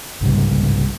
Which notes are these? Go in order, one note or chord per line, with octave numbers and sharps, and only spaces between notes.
C2 G#2 C#3 G3